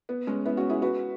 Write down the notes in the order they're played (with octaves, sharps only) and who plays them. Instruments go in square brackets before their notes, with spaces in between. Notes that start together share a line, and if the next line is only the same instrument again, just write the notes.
[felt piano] B3
G#3 C#4
B3 E4
C#4 F#4
E4 G#4
F#4 B4